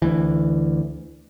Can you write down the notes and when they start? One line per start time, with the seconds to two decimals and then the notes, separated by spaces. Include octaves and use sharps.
0.02 D2 E3